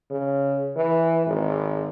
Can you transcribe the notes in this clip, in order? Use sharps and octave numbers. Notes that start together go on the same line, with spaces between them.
C#3
E3
G#1